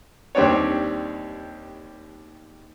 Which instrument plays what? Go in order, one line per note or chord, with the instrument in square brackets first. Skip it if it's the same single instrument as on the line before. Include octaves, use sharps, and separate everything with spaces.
[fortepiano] D#2 G3 C4 D4 C#5